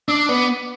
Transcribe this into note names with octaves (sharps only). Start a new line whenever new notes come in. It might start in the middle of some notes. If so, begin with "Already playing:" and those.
D4 D6 E6
B3